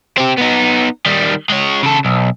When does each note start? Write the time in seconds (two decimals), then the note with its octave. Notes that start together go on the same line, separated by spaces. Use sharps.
0.18 C4 G4
0.38 B3 D#4
1.06 D#3 G3
1.50 G#3 C#5
1.83 C#3 A4
2.05 B1